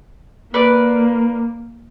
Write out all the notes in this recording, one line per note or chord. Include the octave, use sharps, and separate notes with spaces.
A#3 B4 D5